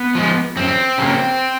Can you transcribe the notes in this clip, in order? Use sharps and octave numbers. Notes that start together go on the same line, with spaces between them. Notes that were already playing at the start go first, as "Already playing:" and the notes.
Already playing: B3
F3 G#3
F#2 C4
C#3 F#3 A#3